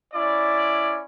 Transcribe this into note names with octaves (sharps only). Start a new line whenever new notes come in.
C#4 E4 D5